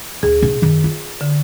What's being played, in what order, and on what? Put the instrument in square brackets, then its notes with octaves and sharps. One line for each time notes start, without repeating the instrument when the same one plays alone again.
[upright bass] D2 [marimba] G#4
[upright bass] C#3 D#4
F#2 D#3
F4
[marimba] D3